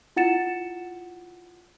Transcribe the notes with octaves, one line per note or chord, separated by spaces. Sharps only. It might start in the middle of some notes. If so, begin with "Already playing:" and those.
E4 F4 F#5 A6 C#7 E7